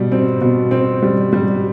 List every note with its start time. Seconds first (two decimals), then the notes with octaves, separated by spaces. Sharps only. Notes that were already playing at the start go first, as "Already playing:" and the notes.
Already playing: B2 G3
0.12 C4
0.41 B2
0.71 C4
1.03 G3
1.33 G3